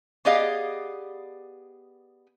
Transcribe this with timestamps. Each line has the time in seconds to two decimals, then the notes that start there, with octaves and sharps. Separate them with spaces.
0.25 B3 G4 G#4 D5 D#5 F5